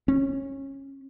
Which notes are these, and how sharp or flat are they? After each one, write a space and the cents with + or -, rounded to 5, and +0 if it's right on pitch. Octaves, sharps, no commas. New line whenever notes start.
C#4 -20